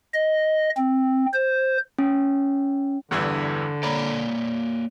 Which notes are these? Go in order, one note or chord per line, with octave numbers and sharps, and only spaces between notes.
D#5
C4
C5
C#4
E2 G2 D3 E3
A#3 C#5 D5 A#5 B5